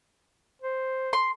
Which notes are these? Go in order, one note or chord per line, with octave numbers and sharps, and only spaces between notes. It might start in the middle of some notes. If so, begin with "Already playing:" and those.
C5
C6